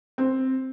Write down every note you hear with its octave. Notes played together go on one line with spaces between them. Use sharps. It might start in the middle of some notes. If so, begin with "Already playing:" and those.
C4